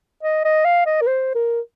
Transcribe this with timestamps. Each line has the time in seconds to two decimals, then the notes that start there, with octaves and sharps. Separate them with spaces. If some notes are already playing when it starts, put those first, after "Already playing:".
0.23 D#5
0.45 D#5
0.65 F5
0.86 D#5
1.01 A#4
1.07 C5
1.35 A#4